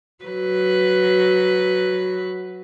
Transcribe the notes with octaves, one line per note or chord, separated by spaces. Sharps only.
F#3 B4